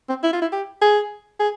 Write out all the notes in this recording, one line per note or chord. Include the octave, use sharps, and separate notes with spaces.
C4
E4
F4
E4
G4
G#4
G#4